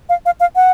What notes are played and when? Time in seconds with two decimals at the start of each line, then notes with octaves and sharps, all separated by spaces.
0.09 F5
0.26 F5
0.40 F5
0.56 F#5